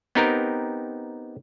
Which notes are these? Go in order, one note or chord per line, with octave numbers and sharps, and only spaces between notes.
B3 C4 D#4 G4 A#4